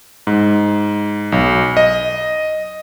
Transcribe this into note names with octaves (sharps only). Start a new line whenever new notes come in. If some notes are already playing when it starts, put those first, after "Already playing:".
G#2
B1
D#5